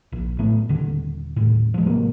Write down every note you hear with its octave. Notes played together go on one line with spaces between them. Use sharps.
A#1
A2 F#3 A3 B3
D#1 D3
D#1 A2
F3 G#3
A1 C3 F#3 A#3